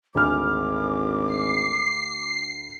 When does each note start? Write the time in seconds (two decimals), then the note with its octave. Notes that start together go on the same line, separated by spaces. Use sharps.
0.15 G#1 D2 G#5 D6 F6
1.26 C7